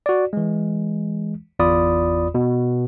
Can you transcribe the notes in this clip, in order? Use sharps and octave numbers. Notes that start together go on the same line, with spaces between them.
F#4 D5
E3 G#3
G1 E2 F4 D5 B5 D#6
B2